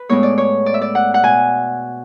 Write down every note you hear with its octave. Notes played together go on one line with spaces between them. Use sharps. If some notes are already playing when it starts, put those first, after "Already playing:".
Already playing: B4
A2 G#3 B3 E4 C#5
D5
C#5
D5
E5
D5
F#5
F#5
B2 G#5